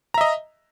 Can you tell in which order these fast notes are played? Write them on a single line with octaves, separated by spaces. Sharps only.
A#5 E5 D#5